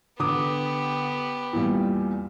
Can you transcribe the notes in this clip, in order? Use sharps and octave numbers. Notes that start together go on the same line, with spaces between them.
D3 B3 G4 D6 D#6
E2 A#2 G3